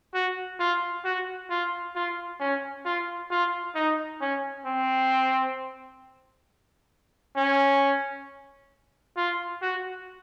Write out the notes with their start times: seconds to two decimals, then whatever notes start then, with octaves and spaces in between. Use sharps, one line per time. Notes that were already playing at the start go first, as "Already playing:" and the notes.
0.14 F#4
0.60 F4
1.05 F#4
1.50 F4
1.96 F4
2.40 C#4
2.85 F4
3.31 F4
3.75 D#4
4.21 C#4
4.66 C4
7.37 C#4
9.17 F4
9.62 F#4